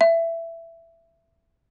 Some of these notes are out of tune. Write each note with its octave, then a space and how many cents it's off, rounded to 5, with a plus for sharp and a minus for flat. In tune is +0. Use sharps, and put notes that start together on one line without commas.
E5 +15